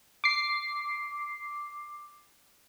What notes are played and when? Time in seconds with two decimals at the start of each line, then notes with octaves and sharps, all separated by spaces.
0.24 D6 C7